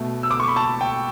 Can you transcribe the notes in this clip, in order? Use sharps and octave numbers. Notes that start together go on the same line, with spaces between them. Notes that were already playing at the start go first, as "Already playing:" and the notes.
Already playing: B2 A3
E6
D6
C#6
B5
A5
G5